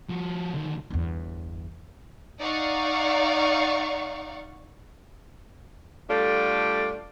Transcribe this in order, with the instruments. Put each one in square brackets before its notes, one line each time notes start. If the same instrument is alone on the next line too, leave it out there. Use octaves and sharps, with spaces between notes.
[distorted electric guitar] F3 F#4
D2 D#3
[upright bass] G1 E2
[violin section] D#4 D5 F5 F#5 C#6
[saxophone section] G3 A3 D4 F4 A4 D5